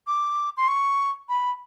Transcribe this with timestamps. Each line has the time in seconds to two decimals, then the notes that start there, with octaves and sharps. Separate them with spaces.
0.07 D6
0.57 C6
0.68 C#6
1.29 B5